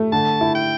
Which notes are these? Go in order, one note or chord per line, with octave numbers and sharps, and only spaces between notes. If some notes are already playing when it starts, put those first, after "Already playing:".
Already playing: A3
D3 A5
E4
G5